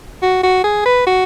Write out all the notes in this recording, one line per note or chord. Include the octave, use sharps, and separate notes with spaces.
F#4
F#4
G#4
B4
F#4